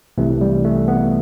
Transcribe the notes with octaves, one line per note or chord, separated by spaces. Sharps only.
C2 C3 E3 A3
G3
A3
B3